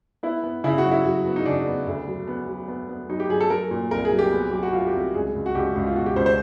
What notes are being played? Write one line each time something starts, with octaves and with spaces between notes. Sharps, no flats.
B3 E4
B3
C#3 E4
F#4
F#3
E4
F#3
B3
D#4
C#3 D4
B3
D2
F#3
B3
F#3
B3
B3
F#3 D#4
G4
F#3 G#4
A4
F#3 A#4
A#2
C2 A#4
G#4
F#3
G4
B3
F#3 G4
F#4
F#3 F4
G4
C2
G4
C#2 G#4
C#2
F#4
C#2 G4
C#2
F4
B2 F#4
G4
C#2 C5
C5